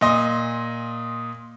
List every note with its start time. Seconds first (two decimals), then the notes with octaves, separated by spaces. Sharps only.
0.01 A#2 D#5 C6